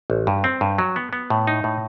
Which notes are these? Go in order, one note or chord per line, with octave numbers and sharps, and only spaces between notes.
A1
G2
C4
G2
F#3
B3
B3
A2
D#4
A2